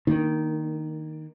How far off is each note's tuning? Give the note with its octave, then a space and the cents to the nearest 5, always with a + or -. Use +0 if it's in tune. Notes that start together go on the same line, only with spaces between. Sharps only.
D#3 +0 A#3 +0 D4 +15